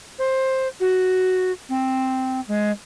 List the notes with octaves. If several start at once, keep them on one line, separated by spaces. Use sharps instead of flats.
C5
F#4
C4
G#3